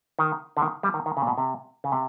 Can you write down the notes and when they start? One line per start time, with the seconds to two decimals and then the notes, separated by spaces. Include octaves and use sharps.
0.19 D#3
0.57 D3
0.62 D#3
0.83 G3
0.94 D#3
1.06 D#3
1.17 C#3
1.22 A#2
1.27 B2
1.38 C3
1.84 C#3
1.92 C3